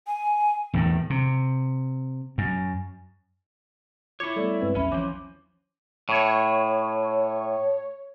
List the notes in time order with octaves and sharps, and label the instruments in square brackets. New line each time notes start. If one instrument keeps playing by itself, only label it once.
[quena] G#5
[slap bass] E2 A2 D#3
C3
F#2
[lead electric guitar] E4 C#5 [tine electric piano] F4 [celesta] D6 C#7
[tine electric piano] G3 A3 B3 [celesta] A4 D5
[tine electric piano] G2 G#3 C4 [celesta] B4
[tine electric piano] A#1 E2 [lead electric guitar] C#4 [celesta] E5 B5
[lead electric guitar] E3 F3 [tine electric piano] C#4 C#5 [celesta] D6
[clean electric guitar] A2 [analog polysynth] C#5